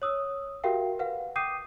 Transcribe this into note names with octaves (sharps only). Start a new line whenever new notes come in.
C#5 D#6 E6
F#4 G4 A#4 E5 F5 G5
B4 F5 F#5
G5 D6 D#6 G6 C7 D#7